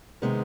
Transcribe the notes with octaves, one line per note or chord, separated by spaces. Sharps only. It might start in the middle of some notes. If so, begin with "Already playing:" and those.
C3 D#3 G#3 B3